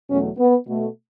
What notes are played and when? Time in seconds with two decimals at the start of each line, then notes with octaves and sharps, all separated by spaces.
0.09 E2 B2 F#3 A3 C#4
0.37 B3
0.67 B2 A3